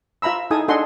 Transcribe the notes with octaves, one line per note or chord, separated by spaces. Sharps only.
F4 E5 A#5 B5 E6
D#4 E4 G#4 A4 G#5 D#6
D4 G#4 A4 D#5 F#5 C6